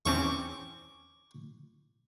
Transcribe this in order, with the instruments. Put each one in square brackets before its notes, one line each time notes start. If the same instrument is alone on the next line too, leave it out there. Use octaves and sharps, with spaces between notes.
[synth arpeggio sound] E2 C4 C#4 [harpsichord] C#6 D6